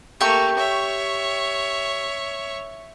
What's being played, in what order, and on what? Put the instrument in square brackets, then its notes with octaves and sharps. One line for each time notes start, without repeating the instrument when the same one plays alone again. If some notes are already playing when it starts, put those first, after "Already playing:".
[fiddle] A3 A#3 [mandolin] G4 C#6
[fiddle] C#5 E5